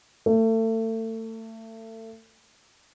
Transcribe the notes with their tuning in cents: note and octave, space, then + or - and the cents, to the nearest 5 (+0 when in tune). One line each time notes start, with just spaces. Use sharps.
A3 +30